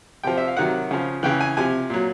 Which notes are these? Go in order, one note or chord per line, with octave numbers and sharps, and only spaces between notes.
C3 F3 G5
E5
F5
C3 D#3 F#3 F#5
C#3 F3
C#3 E3 G5
G#5
C3 F3 G#5
A#2 F#3